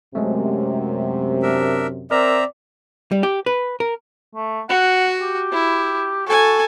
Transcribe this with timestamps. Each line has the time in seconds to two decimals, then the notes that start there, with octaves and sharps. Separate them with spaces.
0.15 F#2 C3 G#3 A3
1.42 D4 A#4 E5
2.11 C4 A#4 D5 E5 A#5
3.12 G3
3.23 G4
3.46 B4
3.80 A#4
4.35 A3
4.69 F#4 F#5
5.21 G4
5.52 E4
6.26 F#4 A4 G#5